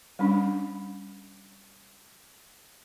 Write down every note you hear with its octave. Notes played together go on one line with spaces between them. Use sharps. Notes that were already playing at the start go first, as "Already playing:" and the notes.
G3 C#4 D4